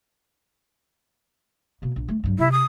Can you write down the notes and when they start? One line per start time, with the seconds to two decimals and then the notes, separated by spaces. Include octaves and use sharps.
1.82 B2 A#3
1.96 A#1
2.08 A3
2.24 G2 F#3
2.39 C3 E4
2.52 D#6